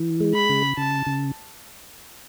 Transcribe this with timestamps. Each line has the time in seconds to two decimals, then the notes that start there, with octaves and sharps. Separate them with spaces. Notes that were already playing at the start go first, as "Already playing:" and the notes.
Already playing: E3
0.20 G#3
0.35 B5
0.49 C#3
0.77 C#3 A5
1.06 C#3